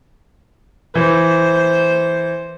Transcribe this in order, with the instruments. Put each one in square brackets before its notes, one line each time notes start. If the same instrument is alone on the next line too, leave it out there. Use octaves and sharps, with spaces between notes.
[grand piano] E3 [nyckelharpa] C5